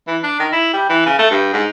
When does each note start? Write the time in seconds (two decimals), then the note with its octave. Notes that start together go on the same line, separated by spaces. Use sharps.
0.07 E3
0.23 D4
0.39 D#3
0.52 E4
0.73 G3
0.89 E3
1.06 C#3
1.19 A3
1.31 G2
1.53 G#2